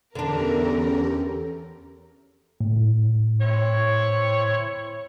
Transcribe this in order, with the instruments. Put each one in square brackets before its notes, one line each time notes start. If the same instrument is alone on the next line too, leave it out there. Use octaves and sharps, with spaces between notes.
[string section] E2 A#4 [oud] D3 D4 [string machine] C#4 G4 A4
[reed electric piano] A2
[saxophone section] C4 E4 C#5